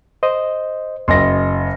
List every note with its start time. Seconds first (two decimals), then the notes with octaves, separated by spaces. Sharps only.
0.23 C5 D#5
1.08 F#1 D#5 C6 A#6